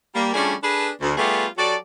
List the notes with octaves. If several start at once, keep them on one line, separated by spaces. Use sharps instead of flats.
G3 A#3
F3 G3 A3 C#4 D4 G#4
D4 G#4 A4 B4
D2
G3 A3 B3 F4 G4 G#4
F#3 F#4 G4 A4 D5